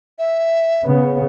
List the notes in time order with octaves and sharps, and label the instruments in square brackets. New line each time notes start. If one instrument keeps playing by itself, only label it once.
[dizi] E5
[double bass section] C#3 B3